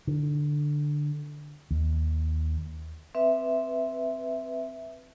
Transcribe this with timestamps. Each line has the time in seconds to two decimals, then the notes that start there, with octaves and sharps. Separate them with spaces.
0.07 D3
1.71 D#2
3.15 C4 B4 E5